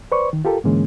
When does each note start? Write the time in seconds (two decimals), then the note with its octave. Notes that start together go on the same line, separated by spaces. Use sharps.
0.12 B4 C5 D5 C#6
0.33 D#3
0.45 F4 G4 A4 A#4
0.64 G#2 D3 E3 G#3 A#3 C#4